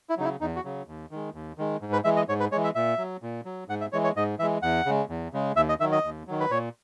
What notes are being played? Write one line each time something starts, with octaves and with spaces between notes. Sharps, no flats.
E4
C#3 F#3 D#4
E4
E2 D#4
F#4
C#3 F#3
D#2
D#3 G#3
D#2
D#3 G#3
G#2
B4
E3 G#3 E5
D#5
G#2 C#5
B4
E3 G#3 C#5
E5
A#2 E5
F#3
A#2
F#3
G#2 F#5
E5
E3 G#3 C#5
C#5
G#2 D#5
E3 G#3 E5
E2 F#5
C#3 G#3
E2
C#3 G#3
D#2 E5
D#5
D#3 F#3 E5
D#5
D#2
D#3 F#3
B4
A#2 C#5